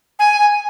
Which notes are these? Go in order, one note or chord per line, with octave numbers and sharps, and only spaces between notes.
G#5